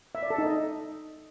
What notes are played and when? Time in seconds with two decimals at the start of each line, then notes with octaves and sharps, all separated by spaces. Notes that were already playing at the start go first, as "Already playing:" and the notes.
0.15 E5
0.23 D5
0.30 A4
0.38 D#4
0.46 D#5